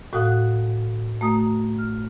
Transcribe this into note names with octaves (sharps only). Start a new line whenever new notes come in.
A2 F#4 F5 F#5 D#6 F#6
A3 F#4 A#5 D#6
F6